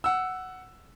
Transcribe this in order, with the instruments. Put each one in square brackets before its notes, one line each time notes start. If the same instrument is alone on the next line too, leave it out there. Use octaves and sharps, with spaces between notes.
[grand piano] F#5 E6